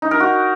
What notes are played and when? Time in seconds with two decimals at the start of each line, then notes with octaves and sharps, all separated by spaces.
0.02 D#4
0.11 A#4
0.20 F#4